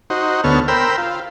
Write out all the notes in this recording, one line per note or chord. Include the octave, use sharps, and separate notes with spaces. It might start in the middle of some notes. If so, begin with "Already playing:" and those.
D#4 F#4 C5
D2 B3 A4 C#5 F6
A#4 C5 G5 B5 E6
F4